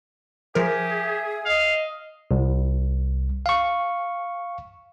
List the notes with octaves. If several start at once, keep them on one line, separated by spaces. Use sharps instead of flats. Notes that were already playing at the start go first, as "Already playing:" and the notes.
F3 G4 G#4 A#4 E5
D#5 F5
C2
F5 C#6